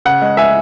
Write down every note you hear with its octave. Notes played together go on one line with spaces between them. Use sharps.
C#3 F#5
G#3
G#3 E5 G#5